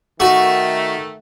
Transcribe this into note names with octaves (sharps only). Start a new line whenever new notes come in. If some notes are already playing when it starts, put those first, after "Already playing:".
D#3 A3 F#4